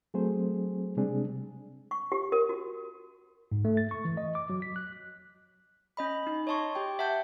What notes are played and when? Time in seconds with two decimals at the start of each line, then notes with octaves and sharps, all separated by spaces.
0.14 F#3 A3 C4 G#4 C5
0.97 C3 G3 G#3 C4 D4 G#4
1.91 C#6
2.12 G4
2.32 A#4
2.49 F#4
3.52 G#2
3.65 A3
3.77 A6
3.91 C#6
4.05 E3
4.17 D#5
4.35 D6
4.50 F#3
4.62 B6
4.76 F#6
5.97 C#4 D#5 B5
6.27 D#4
6.47 C#5 D#5 A5 C6 C#6
6.75 G4 G5
6.99 E5 F#5 A5 G6